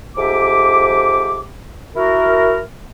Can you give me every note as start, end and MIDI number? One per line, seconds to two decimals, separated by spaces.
0.16 1.42 41
0.16 1.42 44
0.16 1.42 67
0.16 1.42 76
0.16 1.42 86
1.96 2.59 64
1.96 2.59 66
1.96 2.59 70